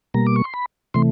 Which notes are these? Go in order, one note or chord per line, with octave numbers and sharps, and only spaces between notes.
B2 G3 A#3 A#5
D6
C#6
C6
B5
C3 E3 A3 C6